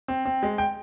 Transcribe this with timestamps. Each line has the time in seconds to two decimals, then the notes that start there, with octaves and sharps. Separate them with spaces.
0.08 C4
0.25 C4
0.43 G#3
0.58 G5